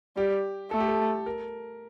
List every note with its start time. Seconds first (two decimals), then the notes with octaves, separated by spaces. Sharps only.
0.16 G3 G4
0.71 A3 A4
0.80 G4
0.88 A4
1.26 A#4